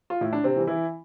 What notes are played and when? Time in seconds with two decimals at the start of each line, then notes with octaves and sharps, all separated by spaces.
0.10 F4
0.21 A2 E4
0.33 D4
0.44 C3 C4
0.56 E3 G3
0.67 E3 E4